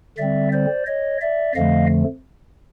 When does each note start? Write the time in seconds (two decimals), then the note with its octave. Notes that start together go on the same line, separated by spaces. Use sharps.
0.18 D3 G3 C4 D5 E5
0.52 C5 D5
0.86 C#5 D#5
1.21 D5 E5
1.55 F2 D3 F3 A3 D#5 F5